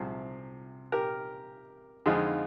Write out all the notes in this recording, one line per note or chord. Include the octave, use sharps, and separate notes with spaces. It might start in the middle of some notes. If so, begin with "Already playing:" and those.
Already playing: C2 C3 F3 G#4 C5
G4 A#4
F2 D3 G#3 D#4 F4 G#4